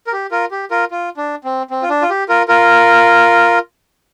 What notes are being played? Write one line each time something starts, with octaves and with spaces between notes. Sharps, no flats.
A#4
G4
F4 A#4
G4
F4 A#4
F4
D4
C4
C4
F4
D4
F4
G4
F4 A#4
F4 A#4